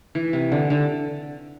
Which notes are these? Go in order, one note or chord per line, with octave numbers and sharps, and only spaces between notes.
E3
C3
D3
D3